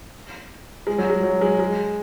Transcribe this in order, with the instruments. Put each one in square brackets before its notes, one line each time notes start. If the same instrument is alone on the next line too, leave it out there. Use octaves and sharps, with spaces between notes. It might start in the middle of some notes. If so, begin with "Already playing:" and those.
[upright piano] G#3
F#3
G#3
F#3
G#3
G#3